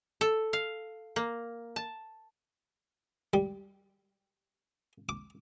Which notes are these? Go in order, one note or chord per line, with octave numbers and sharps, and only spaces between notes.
A4
F5
A#3
A5
G3
D6